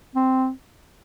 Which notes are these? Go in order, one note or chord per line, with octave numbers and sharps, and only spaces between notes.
C4